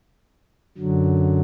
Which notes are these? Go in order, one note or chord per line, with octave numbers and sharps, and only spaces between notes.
F#2 D3 F#3